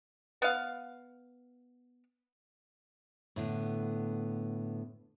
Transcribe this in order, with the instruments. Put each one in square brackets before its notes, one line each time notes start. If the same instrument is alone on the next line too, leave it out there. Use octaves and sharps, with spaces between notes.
[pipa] B3 F5
[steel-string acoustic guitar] A2 D3 B3